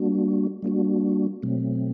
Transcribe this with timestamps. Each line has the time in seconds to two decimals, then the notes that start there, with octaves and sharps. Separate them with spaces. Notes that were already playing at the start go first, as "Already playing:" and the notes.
Already playing: G3 A#3 D4 F#4
0.63 G3 A#3 D4 F#4
1.43 B2 F#3 A3 C4